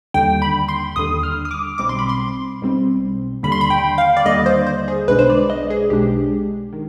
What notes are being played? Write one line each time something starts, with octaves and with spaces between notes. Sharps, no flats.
D#2 D3 G3 G5
B5
C6
D#2 D3 G3 D#6
F6
D#6
D6
B1 B2 G3 C4 D6
C6
B5
C6
B1 B2 G3 C4
D#2 D3 G3 B5
C6
B5
G5
F5
D5
D#2 D3 G3 D#5
C5
C5
G#4
B1 B2 G#3 D4 B4
C5
D5
D#5
G#4
B1 B2 G#3 D4 G4
D#3